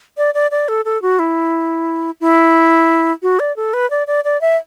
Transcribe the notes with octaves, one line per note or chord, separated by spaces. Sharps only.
D5
D5
D5
A4
A4
F#4
E4
E4
F#4
D5
A4
B4
D5
D5
D5
E5